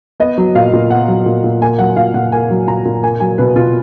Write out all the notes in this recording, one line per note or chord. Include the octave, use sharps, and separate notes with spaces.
B3 D#5
F#3
A#2 F5
A#2
B3 F#5
F#3
A#2
A#2
A#3 G#5
F#3 F#5
A#2 F5
A#2 F#5
A#3 G#5
F#3
A#2 A#5
A#2
A#3 G#5
F#3 G#5
B2 B4
B2 F4